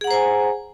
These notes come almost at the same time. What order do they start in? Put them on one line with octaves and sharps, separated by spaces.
G#4 F#5 A#5 C5 G#5